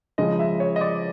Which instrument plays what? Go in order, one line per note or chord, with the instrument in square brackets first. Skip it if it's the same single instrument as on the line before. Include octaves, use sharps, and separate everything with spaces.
[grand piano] C#3 F3 G#3 [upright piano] D#5
[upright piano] E5
C#5
D#5
D5